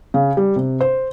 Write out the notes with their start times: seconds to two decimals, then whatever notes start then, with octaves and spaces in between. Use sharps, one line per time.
0.14 C#3
0.37 G3
0.56 C3
0.81 C5